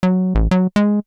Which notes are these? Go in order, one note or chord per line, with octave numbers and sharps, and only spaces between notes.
F#3
A1
F#3
G#3